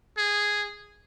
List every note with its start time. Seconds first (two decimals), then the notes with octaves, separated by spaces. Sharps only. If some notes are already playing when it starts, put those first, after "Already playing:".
0.18 G#4